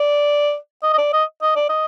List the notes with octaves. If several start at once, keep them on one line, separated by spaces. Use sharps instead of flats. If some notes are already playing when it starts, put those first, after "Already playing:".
Already playing: D5
D#5
D#5
D5
D#5
D#5
D5
D#5